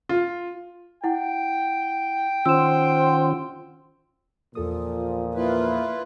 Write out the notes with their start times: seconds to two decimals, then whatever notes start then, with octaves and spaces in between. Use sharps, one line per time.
0.09 F4
1.04 E4 F#5 G5
2.46 D#3 C#4 F4 C5 F#5 C6 E6 E7
4.55 E2 A#2 F3 F4 A4 D#6
5.34 A#3 E4 F4 B4